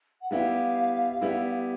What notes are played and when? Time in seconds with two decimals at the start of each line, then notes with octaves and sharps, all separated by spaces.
0.21 F#5
0.30 G3 B3 E4 G4 F5
1.21 G3 B3 E4 G4